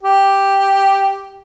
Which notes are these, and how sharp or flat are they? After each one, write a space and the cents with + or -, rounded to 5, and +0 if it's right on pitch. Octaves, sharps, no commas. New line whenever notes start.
G4 +0